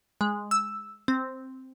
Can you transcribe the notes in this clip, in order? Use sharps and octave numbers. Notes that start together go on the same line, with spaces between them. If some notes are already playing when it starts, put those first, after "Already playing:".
G#3
E6
C4